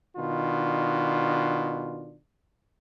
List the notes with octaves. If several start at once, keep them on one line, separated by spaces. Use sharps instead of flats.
B2 D#3 D4 F4